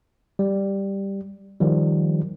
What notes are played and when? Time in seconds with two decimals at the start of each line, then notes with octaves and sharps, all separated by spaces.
0.39 G3
1.60 D#3 F3 G3